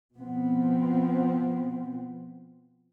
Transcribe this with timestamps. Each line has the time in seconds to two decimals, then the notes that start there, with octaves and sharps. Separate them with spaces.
0.16 B2 F3 B3 C4